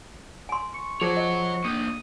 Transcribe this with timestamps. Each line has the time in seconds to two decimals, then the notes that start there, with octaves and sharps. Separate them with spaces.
0.49 G#5 C6
0.74 C#6
1.01 F3 G#4 C#5 F#5 C#6
1.17 D#5
1.64 A#3 D4 D#6